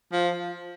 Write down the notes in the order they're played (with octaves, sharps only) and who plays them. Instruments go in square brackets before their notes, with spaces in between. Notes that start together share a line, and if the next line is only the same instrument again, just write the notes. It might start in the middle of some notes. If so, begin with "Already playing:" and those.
[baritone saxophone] F3